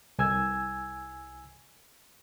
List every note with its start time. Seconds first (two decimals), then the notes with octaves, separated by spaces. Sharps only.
0.19 C2 G#5 E6 G#6